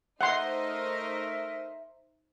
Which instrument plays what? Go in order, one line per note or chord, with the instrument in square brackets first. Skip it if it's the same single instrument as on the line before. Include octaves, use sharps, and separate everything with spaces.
[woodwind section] A3 A#4 E5 [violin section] D#4 C5 D#5 [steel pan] F#5 C6